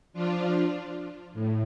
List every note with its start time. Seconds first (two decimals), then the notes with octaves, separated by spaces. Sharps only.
0.13 F3 D4 F4
1.33 A2